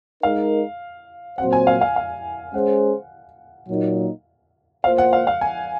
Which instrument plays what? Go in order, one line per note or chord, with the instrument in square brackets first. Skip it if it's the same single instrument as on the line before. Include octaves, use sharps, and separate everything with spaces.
[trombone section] G#3 D#4 A#4 [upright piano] F5
[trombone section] A#2 F#3 C4 F#4 C5 [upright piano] F#5
[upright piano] G#5
F5
F5
F5
[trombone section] G#3 C#4 G#4 C5 [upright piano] F#5
[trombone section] A#2 F#3 A#3 D#4
[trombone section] A#3 F4 C5 [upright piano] F5
[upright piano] F#5
F5
F5
G#5